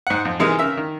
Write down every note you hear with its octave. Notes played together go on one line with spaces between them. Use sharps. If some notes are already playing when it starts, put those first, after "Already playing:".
G#2 F#5
F2
C3 E3 G#3 D#4 A#4
C#3 A#4 E5 E6
D#3